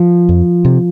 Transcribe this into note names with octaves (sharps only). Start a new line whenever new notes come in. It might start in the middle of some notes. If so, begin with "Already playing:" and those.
Already playing: F3
F2
C3